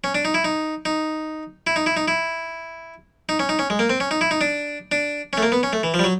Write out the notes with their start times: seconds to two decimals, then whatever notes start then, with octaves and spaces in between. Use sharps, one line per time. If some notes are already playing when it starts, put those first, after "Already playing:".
0.04 C#4
0.15 D4
0.25 D#4
0.34 E4
0.44 D#4
0.85 D#4
1.67 E4
1.76 D#4
1.86 E4
1.97 D#4
2.08 E4
3.29 D#4
3.39 C#4
3.49 D#4
3.59 C#4
3.70 G#3
3.79 A#3
3.90 C4
4.00 C#4
4.11 D#4
4.21 E4
4.31 D#4
4.41 D4
4.92 D4
5.33 C#4
5.37 A3
5.43 A#3
5.52 B3
5.63 C#4
5.73 A3
5.83 E3
5.94 F3
5.99 G3
6.04 F#3